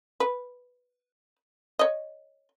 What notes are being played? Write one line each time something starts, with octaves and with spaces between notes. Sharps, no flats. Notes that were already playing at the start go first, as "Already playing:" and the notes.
B4
C#5 D#5